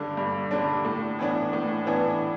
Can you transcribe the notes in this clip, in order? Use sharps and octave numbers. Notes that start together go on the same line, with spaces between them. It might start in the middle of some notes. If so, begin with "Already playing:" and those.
Already playing: G2 D3 G3 D4
G2
D3 G3 D4
A2
E3 B3 D4
A2
E3 B3 D4